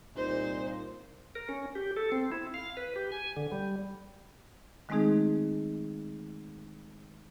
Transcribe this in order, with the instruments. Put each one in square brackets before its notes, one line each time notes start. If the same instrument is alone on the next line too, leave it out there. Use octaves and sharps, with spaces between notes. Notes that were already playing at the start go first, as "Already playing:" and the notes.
[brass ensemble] C2 A#2 [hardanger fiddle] D#4 C5
[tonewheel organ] A#4
C#4
G4
A4
C4
E4
F5
B4
G4
G#5
D3
G3
[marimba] D#3 G#3 A3 C4 D#4 G#4